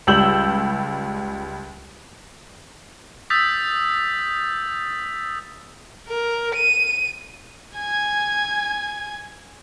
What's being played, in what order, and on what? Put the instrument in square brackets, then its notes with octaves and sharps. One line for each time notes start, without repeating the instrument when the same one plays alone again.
[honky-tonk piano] C#2 G3 E6 G6 F#7
[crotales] D#6 E6 G6 A6 B6
[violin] A#4
D#7
[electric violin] G#5 G#6